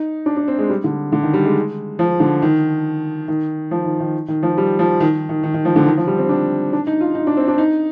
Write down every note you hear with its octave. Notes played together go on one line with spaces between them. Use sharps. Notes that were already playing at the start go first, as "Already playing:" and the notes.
Already playing: D#4
D4
D4
C4
G#3
G3
D3
D3
D#3
G3
G#3
F3
D3
D#3
D#3
F3
D#3
D#3
D#3
F3
G3
F3
D#3
D#3
D#3
D#3
F3
D3
D#3
F3
G3
C4
D4
D4
D#4
F4
D#4
D4
C4
D4
D#4